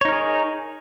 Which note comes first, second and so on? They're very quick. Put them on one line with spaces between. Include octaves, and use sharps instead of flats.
C#5 D#4 A#4 G#4